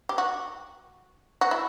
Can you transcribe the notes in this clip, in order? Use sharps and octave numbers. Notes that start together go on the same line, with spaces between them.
G4
F#4
F#4
E4